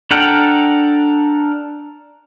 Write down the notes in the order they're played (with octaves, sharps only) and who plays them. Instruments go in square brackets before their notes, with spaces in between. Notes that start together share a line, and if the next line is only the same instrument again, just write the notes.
[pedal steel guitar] D4 A4 A#4 F#5 G5